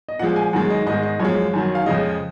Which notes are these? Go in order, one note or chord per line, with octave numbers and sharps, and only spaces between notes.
D#5
A#2 F3 G#3 F#5
G#5
F#2 D#3 G#3 F#5
D#5
G#2 D#3 G#3 D#5
D#5
F#2 F3 G#3 C#5
F#2 D#3 F#3
F5
F2 C#3 F3 G#3 D#5